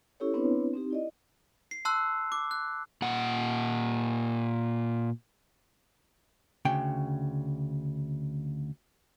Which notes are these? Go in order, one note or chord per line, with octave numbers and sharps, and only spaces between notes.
C#4 E4 G4 A4 C#5
B3 C4 D4 E4 B4 C#5
C4 D#4 G4
E4 D5 D#5
C7
A5 C6 E6 F#6
D6
F#6
A#2 F#5
D2 C#3 G5